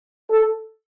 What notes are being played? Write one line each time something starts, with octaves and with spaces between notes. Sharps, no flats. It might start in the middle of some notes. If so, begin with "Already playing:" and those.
A4